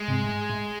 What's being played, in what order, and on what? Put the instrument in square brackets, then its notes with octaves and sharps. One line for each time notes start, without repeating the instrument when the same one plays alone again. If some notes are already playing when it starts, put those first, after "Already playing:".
Already playing: [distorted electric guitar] G#3
[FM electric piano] G#2 C3
A2
G#2
A2